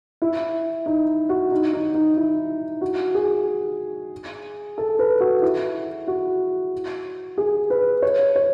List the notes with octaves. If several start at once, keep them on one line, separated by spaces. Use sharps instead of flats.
E4
D#4
F#4
D#4
D#4
D#4
E4
F#4
G#4
A4
B4
F#4
E4
F#4
G#4
B4
C#5
C#5